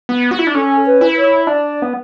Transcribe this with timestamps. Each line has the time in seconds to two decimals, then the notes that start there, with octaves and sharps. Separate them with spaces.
0.09 B3
0.31 F#4
0.39 E4
0.47 D4
0.55 C#4 A4
0.86 B4
1.01 E4
1.17 C#5
1.47 D4 D5
1.82 B3